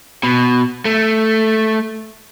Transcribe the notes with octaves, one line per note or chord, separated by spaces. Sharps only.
B2
A3